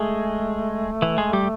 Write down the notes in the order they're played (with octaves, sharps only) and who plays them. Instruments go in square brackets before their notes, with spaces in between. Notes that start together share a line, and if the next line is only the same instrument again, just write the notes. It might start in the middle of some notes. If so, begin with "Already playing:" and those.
Already playing: [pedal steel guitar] G#3 G#4 [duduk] A3
[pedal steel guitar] E3 E4
G#3 G#4
G3 G4